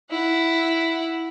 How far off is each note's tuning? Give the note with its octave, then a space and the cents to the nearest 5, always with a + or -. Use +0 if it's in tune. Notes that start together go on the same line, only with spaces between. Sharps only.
E4 +0 F#5 -5